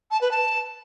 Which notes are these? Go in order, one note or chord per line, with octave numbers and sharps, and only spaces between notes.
A5
B4
A5